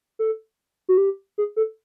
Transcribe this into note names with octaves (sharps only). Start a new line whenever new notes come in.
A4
F#4
G4
G#4
A4